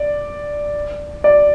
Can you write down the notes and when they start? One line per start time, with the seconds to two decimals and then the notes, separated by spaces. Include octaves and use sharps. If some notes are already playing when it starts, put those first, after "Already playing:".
Already playing: D5
1.24 D5